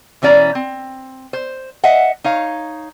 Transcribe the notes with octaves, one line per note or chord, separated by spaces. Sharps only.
B2 E3 C#4 D5 A#5
C4
C5
D#5 E5 F#5
D#4 C#5 F5